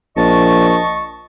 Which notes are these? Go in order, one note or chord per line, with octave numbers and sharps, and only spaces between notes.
A#1 D#5 A5 C#6